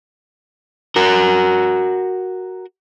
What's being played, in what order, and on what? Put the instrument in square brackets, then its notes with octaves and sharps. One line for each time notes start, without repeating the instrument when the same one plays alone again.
[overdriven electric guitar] F#4 A#4